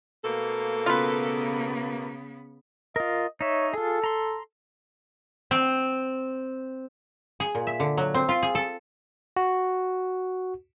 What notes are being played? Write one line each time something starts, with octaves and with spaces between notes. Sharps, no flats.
B2 A3 A#3 A4
C#3 B3 F4 B4
F4 A#4 D#5
D#4 C#5 E5
F4 G#4 A4
A#5 C6
C4
G#4
A#2
E5
D3
F#3
C4
F4
G#4
A4
F#4